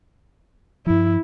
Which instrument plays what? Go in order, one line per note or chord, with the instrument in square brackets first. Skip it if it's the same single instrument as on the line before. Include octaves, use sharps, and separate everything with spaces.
[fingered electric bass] G2 F3 [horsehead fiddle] E4